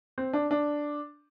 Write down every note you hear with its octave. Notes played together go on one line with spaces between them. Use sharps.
C4
D4
D4